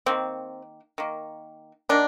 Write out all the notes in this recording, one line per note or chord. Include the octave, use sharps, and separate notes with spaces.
D#3 A#3 C4
D#3 A#3
D#3 A#3 D4